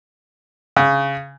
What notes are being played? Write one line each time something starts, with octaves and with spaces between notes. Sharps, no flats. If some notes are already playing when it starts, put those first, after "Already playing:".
C#3